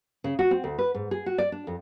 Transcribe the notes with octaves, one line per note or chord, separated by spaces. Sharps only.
C#3
F#4
C4
D2
B4
G#2
G#4
F#4
D5
D4
F2